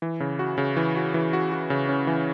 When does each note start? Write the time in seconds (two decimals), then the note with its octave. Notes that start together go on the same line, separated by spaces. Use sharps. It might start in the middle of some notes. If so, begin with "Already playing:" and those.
0.02 E3
0.20 C#3
0.39 F#4
0.58 C#3
0.77 E3
0.96 F#4
1.14 E3
1.33 F#4
1.52 F#4
1.70 C#3
1.89 C#4
2.07 E3